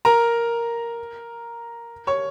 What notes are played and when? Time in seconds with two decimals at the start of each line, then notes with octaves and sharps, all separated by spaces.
0.05 A#4 A#5
2.07 C#5 C#6